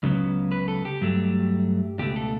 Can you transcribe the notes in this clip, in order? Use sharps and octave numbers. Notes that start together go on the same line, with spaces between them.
C#2 C#3 F#3 B3
B4
A4
G4
G2 F#3 A3
C#2 B2 A3 G4
A4